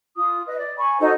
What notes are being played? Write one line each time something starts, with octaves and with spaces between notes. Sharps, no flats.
F4 D#6
B4 D#5
D5
G#5 B5 C#6
D#4 F#4 A4 C5